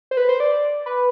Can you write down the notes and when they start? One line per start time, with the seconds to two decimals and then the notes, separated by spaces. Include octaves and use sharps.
0.11 C5
0.17 B4
0.29 C5
0.40 D5
0.86 B4